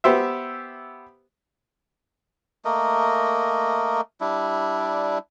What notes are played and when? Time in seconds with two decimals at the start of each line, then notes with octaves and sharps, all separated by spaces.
0.04 B3 G4 C5 E5
2.65 A3 A#3 A#4 D#5
4.21 G3 D4 E4